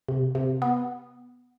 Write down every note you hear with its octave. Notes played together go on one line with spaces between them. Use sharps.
C3
C3
B3